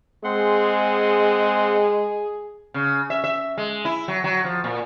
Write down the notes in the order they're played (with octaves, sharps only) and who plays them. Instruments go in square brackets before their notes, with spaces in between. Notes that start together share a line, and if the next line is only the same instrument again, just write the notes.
[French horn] G#3 [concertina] C4 F#5 C6 [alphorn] G#4
[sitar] C#3
E5
E5
G#3
E4
F#3
F#3
F3
A#2